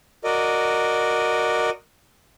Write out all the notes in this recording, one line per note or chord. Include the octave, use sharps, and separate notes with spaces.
F#4 A#4 D5 D#5